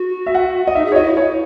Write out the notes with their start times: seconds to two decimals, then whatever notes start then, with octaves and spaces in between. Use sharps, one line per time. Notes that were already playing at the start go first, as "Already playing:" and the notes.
Already playing: F#4
0.26 E5
0.35 F#5
0.67 D#5
0.75 D#4 E5
0.85 G#4
0.92 C#5
0.95 F#4 D#5
1.03 E4
1.17 C#5